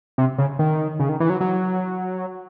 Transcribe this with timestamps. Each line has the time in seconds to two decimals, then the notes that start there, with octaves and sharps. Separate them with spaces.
0.18 C3
0.38 C#3
0.59 D#3
1.00 C#3
1.09 D#3
1.20 E3
1.30 F#3
1.40 F#3